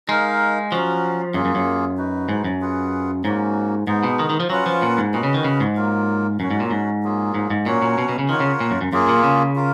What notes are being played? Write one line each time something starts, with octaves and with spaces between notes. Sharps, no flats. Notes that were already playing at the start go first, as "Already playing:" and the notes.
G#3 D#4 A#4 F5
F3 F#3 C#4 F#4
F#2 A#3 F4 G#4
F#2
F#2
D#4 F#4 B4
G#2
F#2
F4 G#4 B4 F#5
G#2 F#3 A#3 C#4 F#4
G#2 G#3 B3 D#4
B2
D#3
D#3
F3
F#3 C#4 F4 B4 F#5
F3
A#2
G#2
A#2 C#4 F#4 B4 D#5
C#3
D#3
C#3
G#2
F#3 A#3 F4 A#4
F#2 F#3 C#4 F#4 C#5
G#2
A#2
G#2
F#3 A#3 F4 G#4
G#2
G#2
A#2 F#3 C#4 F#4 C#5
A#2
B2
B2
C#3
D#3 F4 A#4 C#5 F#5
C#3
A#2
F#2
F#2
F#2 A#3 F4 G#4
A#2
C#3
F4 A#4 F5